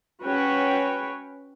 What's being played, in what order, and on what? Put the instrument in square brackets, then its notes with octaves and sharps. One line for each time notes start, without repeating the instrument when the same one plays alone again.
[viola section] C#4 F#4 B4 C#5 G5